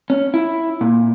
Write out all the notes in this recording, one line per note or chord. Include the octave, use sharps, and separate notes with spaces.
C#4
E4
A#2